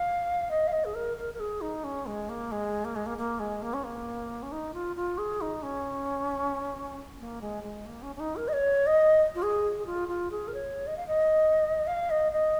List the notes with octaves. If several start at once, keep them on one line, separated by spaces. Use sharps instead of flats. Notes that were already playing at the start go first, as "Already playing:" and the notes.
Already playing: F5
D#5
F5
D#5
G#4
A#4
A#4
A#4
G#4
D#4
C#4
G#3
A#3
G#3
A#3
G#3
A#3
A#3
G#3
A#3
C#4
A#3
C#4
D#4
F4
F4
G#4
D#4
C#4
A#3
G#3
G#3
A#3
C#4
C#4
D#4
A#4
D#5
C#5
D#5
F4
G#4
G#4
F4
F4
G#4
A#4
C#5
D#5
F5
D#5
F5
D#5
D#5